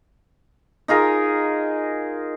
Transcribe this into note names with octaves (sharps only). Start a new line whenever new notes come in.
D#4 F4 G#4 A#4